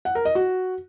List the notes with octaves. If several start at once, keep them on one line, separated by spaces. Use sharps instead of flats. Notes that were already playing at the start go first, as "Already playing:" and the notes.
F#5
A#4
D#5
F#4